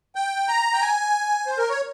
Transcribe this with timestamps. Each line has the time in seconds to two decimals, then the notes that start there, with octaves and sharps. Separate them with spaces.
0.15 G5
0.49 A#5
0.74 G5
0.81 G#5
1.47 C5
1.58 A#4
1.69 C#5